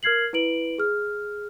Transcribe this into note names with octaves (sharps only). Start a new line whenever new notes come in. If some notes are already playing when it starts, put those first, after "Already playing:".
A#4 F6 G#6 C7 F#7
E4 B4 D7 F#7
G#4 F6